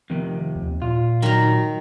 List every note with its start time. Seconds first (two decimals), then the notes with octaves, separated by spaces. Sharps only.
0.10 F2 C3 D#3
0.55 D#2
0.82 A#2 F4
1.22 D#3 F#3 A#5